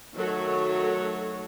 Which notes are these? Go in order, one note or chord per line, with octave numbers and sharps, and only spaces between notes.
D#3 F#3 A3 F#4 A4 C#5